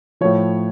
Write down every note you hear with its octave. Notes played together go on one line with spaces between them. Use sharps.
A2 F3 C#5